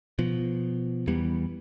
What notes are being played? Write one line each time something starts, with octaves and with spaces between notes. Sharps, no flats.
B2 F3
E2 E3 G3 B3